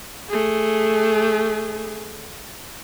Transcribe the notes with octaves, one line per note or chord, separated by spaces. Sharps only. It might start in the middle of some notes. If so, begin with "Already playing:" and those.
A3 G#4